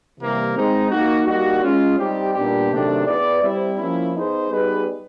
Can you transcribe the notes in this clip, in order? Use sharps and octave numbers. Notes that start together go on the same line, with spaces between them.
C3 E3 G3 A#3
G#3 C4 D#4
A#3 D#4 F#4
G3 A#3 D#4 F#4
G#3 C#4 F4
G3 C4 D#4 G4
A#2 G3 B3 D4 G4
C3 D#3 F#3 A3 D4
B3 E4 G#4 B4 D5
G3 C4 E4
F3 A#3 C#4 E4
B3 D#4 G#4 C5
G3 B3 D#4 G#4 B4